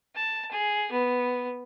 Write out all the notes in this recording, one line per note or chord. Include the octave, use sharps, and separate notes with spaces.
A5
G#4
B3